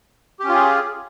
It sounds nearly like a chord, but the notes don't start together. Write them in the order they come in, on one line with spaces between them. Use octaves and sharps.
G4 C#4 F4 G#4